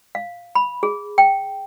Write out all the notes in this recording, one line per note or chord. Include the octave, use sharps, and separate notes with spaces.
F5
B5
G#4
G5